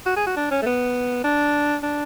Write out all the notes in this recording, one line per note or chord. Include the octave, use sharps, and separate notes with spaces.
F#4
G#4
F#4
D4
C#4
A3
B3
D4
D4